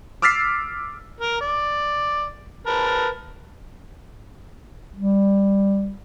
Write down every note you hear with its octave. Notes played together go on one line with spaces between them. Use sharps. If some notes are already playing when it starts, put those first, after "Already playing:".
D6 E6 F6 A6 B6 C7
A#4
D5
A#4 B4 A5
G3